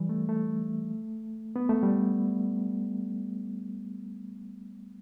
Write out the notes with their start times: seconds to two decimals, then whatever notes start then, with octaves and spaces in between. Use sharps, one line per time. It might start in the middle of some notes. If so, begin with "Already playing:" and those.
Already playing: E3 G3
0.09 A3
0.29 A3
1.56 B3
1.69 A3
1.83 G3